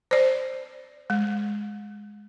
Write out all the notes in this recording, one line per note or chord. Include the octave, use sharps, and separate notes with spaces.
C5 D5
G#3